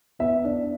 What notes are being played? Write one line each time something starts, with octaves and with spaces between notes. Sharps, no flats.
B3 E5
D4